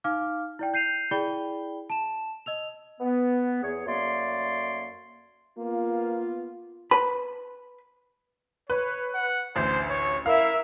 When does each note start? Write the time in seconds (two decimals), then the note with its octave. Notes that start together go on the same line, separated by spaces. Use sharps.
0.04 D#4 F5 D6 F6
0.59 E4 D5 G5
0.74 G6 C7 D#7 F7
1.11 E4 G#4 D5 G5 B5 G7
1.90 A5 E7
2.46 D#5 E6 F7
3.00 B3
3.63 E2 G#4 C#5
3.86 F#2 A3 A#3 C#5 D5 C6
5.58 A#3 B3 F4
6.91 B4 B5
8.70 B4 C#5
9.15 F#5
9.56 A1 D2 C5
9.90 C#5
10.26 E4 A#4 E5 F5